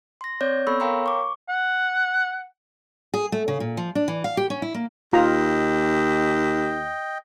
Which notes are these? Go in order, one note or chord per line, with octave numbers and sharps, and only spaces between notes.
C6 A#6
C4 C#5 D5 G6
B3 A4 B5 C#6 E6
A#4 C#5 F5 G5 A#5 C6
C#6 D6
F#5
G#4
A3
C#3
A#2
F3
D4
E3
F5
G4
C#4
E4
A#3
D#2 F4 D#5 G5 A#5